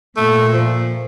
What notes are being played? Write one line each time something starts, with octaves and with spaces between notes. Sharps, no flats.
A#2 A3
F3